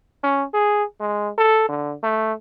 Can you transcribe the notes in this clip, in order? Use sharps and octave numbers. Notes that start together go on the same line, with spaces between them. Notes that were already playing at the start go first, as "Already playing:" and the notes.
C#4
G#4
G#3
A4
D3
A3